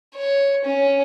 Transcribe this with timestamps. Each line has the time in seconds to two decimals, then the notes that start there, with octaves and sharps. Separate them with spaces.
0.15 C#5
0.65 C#4